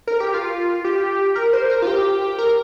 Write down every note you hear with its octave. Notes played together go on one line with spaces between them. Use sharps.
A#4
G4
F4
G4
A#4
C5
A#4
F4
G4
A#4